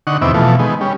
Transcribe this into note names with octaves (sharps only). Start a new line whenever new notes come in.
D3 D#4 F#5 C#6
E2 C3 D#3 B3 E5 D6
B2 E3 F3 A3
D#3 G#3 B3
G3 C#4